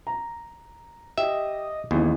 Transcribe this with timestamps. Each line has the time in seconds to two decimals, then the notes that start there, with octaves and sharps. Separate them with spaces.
0.07 A#5
1.18 G4 D#5 E5
1.91 A1 D#2 E3 B3 G#4